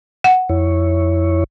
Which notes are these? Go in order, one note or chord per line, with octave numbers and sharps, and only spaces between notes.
F#5
F2 E4 C#5